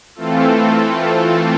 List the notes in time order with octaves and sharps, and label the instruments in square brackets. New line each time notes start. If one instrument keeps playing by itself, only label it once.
[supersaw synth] E3 A3 C4 F4 A4